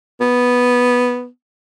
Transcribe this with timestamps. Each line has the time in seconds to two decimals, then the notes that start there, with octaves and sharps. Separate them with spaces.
0.21 B3